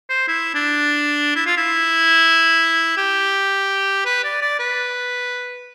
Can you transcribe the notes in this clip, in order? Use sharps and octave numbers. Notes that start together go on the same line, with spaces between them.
C5
E4
D4
E4
F4
E4
G4
B4
D5
D5
B4